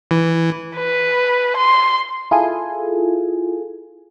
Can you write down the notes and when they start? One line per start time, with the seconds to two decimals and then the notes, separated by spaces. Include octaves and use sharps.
0.11 E3
0.76 B4
1.57 C6
2.31 E4 F4 G#4 A4 G#5